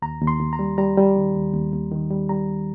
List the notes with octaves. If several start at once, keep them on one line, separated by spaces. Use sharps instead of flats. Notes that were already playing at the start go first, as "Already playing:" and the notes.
D#2 A#5
D#2
C6
D#2
A#5
G3
G3 A#5
G3
D#3
D#2
D#2
D#2
D#3
G3
G3 A#5
D#2